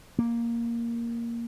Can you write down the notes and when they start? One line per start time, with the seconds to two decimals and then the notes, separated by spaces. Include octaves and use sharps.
0.19 A#3